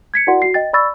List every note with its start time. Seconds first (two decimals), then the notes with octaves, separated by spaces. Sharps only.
0.14 G#6 B6 C#7
0.27 E4 F#4 A#4 D5 F#5 C6
0.42 F#4 C7
0.54 D#5 G5 A6
0.73 D5 B5 C#6 E6 A6